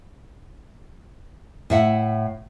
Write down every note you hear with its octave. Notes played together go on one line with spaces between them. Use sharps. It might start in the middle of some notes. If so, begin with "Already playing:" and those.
A2 E5 F#5